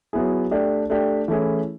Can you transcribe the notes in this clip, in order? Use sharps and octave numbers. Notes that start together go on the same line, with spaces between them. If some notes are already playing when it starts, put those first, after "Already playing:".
F#3 B3 E4 G#4
A3 D4 G4
A3 D4 G4
E3 A3 C#4 E4 G#4